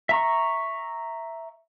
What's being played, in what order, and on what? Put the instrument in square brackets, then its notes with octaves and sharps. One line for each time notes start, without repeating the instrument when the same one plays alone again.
[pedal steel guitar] E5 A#5 C#6